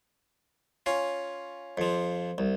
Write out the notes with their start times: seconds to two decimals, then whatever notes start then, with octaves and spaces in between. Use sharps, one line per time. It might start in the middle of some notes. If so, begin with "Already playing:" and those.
0.86 C#4 F4
1.78 F2 F3
2.38 C2